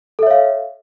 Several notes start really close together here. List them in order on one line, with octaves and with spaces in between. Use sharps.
A4 E5 C#5 F5